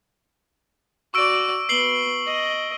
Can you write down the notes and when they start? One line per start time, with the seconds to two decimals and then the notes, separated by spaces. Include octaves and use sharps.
1.14 F#4 D5 C#6 E6 D7
1.69 B3 C7 F#7 G7
2.26 D#5